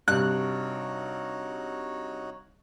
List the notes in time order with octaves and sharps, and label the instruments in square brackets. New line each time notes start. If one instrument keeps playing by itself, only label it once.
[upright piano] G2 C3 [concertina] D#4 F#4 C#5 [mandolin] F#6